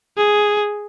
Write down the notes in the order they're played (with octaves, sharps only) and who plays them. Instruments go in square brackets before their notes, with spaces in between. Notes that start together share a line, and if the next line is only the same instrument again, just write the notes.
[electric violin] G#4